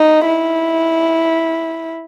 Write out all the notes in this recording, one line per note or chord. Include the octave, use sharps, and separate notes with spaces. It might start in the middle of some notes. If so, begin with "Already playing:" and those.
Already playing: D#4
E4